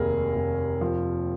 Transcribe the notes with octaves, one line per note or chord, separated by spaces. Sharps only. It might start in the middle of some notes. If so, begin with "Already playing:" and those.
Already playing: F1 D#2 G#4 A#4
F1
F3